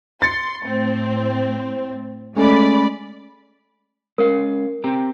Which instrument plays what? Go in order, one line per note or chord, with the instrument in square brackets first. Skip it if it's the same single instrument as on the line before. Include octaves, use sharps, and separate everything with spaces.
[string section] C6 [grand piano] A6 C#7
[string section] A2 C4
[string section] G#3 D5 B5 [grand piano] A3 C#4
[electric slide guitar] G#3 C#4 F5 [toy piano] A#4
[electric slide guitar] C4 G4 A#5